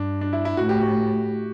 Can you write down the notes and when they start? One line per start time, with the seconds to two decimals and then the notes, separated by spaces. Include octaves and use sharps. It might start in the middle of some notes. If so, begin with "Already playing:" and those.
Already playing: G2 D4
0.21 D4
0.33 E4
0.45 E4
0.57 A2 F#4
0.69 G4
0.81 F#4